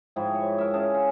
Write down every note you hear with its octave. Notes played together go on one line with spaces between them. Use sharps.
G#2 F3 E4 G5
C#5
A#4 E5
C#4 G#4 F5 A5
F4